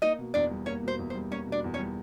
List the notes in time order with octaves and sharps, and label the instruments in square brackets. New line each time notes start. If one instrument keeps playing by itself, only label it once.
[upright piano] A#3 [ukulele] D#4 D#5
[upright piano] B2
[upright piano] E2 [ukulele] D4 D5
[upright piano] G3
[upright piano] A#3 [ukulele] C#4 C#5
[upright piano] B2 [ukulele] C5
[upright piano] E2
[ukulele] C5
[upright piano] G3
[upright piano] A#3 [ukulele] C#4 C#5
[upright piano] B2
[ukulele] D4 D5
[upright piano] E2
[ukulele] C#4 C#5
[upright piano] G3